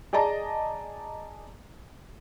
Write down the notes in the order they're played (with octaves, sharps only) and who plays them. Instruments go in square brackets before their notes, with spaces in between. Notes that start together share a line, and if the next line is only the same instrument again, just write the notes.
[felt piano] G#4 D5 D#5 A5 A#5